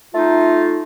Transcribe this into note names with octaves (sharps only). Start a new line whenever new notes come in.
A3 D#4 F4